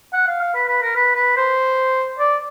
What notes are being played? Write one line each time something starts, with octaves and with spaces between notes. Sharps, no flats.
F#5
F5
F5
B4
B4
A#4
B4
B4
C5
D5